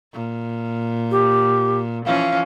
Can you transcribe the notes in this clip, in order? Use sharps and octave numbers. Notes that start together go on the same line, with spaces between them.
A#2
G4
E3 F3 C#4 F5